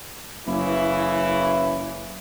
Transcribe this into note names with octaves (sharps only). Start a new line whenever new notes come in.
F#1 C#3 E3 E4